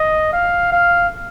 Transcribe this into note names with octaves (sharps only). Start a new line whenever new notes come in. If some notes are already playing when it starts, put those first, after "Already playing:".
Already playing: D#5
F5
F5